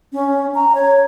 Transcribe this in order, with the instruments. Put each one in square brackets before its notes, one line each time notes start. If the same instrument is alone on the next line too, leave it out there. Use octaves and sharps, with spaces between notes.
[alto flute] C#4
A#5
C#5